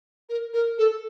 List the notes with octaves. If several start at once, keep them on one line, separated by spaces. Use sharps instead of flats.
A#4
A#4
A4